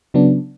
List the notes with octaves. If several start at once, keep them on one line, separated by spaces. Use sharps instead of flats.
C#3 F#3 B3 D4